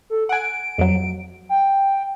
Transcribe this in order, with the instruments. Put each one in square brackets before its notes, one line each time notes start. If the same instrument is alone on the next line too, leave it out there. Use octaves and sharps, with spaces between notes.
[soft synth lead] A4
[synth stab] F#5 G#5 [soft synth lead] D7
[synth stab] F2 F#3
[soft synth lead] G5